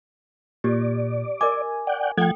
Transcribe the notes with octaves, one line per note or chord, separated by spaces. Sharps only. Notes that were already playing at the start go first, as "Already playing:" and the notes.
A#2 G4 D5
A#4 D#5 G#5 D6
D5 F#5 G5
F3 A3 A4 F#5 G5 G#6